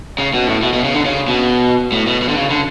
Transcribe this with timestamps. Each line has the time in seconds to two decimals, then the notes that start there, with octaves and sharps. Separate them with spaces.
0.18 C#3
0.34 B2
0.47 A2
0.62 B2
0.73 B2
0.84 C#3
0.94 D3
1.05 C#3
1.28 B2
1.92 A2
2.07 B2
2.22 B2
2.28 D3
2.36 C#3
2.50 D3